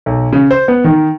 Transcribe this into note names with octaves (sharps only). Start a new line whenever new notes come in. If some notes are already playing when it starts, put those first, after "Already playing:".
B1
C#3
C5
B3
D#3